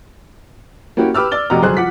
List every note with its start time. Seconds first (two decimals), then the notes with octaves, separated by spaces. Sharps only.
0.97 A#3 C#4 E4 F#4 G4
1.14 G4 B4 D6 E6 F6
1.32 D5 D6 A6 G7
1.50 F1 C3 F#4 D#5 A#5
1.62 G1 F#2 G#4 C5 F#6
1.77 F3 F#5 D6 B6